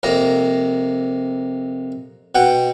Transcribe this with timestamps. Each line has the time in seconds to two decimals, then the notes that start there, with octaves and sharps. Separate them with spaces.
0.03 F2 C3 A#3 A#5
2.35 B2 F#5 G5